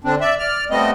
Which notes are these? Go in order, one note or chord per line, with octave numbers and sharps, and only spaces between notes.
D3 C4 D4
D5 E5
D5 F6
G3 A3 B3 C4 D#5